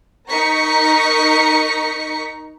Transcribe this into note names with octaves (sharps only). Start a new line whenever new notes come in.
D#4 A#4 A#5 C#6 B6 C#7